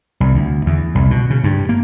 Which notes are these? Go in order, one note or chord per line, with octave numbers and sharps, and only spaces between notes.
C2
D2
E2
C2
B2
C#3
G2
A#3